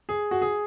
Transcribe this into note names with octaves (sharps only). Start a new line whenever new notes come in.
G#4
F#4
G#4